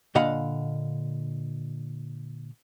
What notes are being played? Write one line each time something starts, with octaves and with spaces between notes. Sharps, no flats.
A#2 D3 D#5 F5 F#5 B5